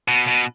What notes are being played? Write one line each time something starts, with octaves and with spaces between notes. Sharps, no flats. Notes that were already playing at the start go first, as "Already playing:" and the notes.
B2
B2